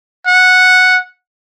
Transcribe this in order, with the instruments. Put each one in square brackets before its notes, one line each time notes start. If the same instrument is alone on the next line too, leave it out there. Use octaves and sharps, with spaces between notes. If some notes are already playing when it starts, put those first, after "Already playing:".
[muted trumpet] F#5